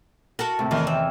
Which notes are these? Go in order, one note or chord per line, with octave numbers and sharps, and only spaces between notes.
F#4 A4 A#4
D#2 A2 C3
E2 D#3 E3 A#3
C4 E6